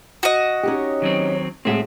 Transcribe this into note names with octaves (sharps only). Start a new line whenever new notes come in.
F#4 D#5
C#4 D#4 G4
D#3 F#3 C4
A2 G#3 C4 F#4 E5